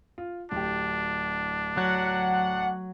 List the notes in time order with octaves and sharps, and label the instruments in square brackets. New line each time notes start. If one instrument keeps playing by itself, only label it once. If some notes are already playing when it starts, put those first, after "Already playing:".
[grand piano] F4
[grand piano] D1 G4 [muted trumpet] D4
[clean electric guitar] F#3 [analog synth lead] F#5